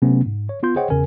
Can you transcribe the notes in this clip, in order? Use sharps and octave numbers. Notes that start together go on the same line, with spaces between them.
C3 F#3 A3 B3 C#4
G#2
C#5
B3 F4 C6 G6
G#4 C5 C#5 D#5 F#5 G5
E2 C#3 A#4 G#5